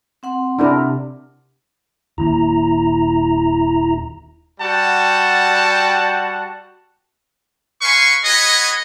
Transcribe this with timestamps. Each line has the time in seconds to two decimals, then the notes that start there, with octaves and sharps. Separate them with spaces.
0.23 C4 F#5 C6
0.59 C3 D4 E4 A#4
2.18 D#1 D#3 A#3 E4 A#5
4.60 G3 F#4 F#5 G5 A5
7.82 B4 F5 G#5 C6 C#6
8.25 F#4 G#4 B4 C#5 D#5